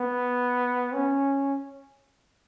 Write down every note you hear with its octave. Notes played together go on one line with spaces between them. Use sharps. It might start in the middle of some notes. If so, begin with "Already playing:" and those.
Already playing: B3
C#4